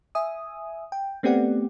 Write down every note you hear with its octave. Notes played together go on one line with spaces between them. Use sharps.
E5 G#5 D#6
G5
A3 B3 C4 G4 D5 F#5